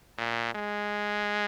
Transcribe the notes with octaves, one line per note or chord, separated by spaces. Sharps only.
A#2
G#3